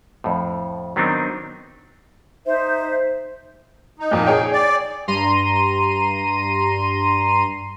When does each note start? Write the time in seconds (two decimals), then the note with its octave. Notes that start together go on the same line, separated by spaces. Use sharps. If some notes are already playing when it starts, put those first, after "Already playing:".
0.24 F2 A2
0.96 D#3 F#3 B3 C4 D4 D#4
2.46 D#4 C5 E5
3.99 D#4
4.11 F2 A#2
4.27 G#4 C#5 G5
4.53 D5
5.08 G2 A#5 C6 D#7